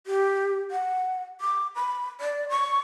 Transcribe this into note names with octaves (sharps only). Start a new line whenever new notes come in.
G4
F#5
D6
B5
D5
C#6